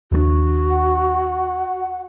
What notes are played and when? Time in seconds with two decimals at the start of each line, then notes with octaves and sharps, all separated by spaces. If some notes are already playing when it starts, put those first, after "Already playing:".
0.12 D#2 A3 D4 F#4
0.70 F#5